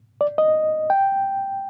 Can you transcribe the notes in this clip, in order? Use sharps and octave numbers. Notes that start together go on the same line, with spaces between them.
D5
D#5
G5